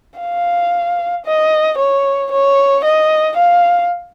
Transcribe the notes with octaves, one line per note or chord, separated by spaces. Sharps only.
F5
D#5
C#5
C#5
D#5
F5